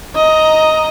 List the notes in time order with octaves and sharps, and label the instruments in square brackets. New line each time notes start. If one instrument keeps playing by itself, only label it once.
[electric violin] D#5 A#5